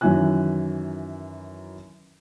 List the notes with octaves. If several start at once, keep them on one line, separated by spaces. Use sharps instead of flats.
F#2 D#3 E3 E4 G#5 F#6